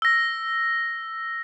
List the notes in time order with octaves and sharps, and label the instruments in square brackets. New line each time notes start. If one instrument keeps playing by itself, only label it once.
[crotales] E6 A#6